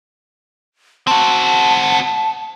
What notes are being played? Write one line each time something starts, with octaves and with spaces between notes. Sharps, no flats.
C4 F#4 A5